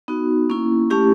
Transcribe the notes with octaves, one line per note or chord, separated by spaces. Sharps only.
B3 D#4 F#4
A#3 C#4 E4
A3 C#4 E4 G4